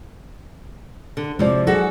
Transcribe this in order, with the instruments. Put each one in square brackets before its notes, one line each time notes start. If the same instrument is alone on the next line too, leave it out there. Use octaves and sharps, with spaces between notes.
[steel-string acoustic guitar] D3
[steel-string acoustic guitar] C3 F3 [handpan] G#3 E4 D5
[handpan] F#3 G#4 [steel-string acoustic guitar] F#4 A4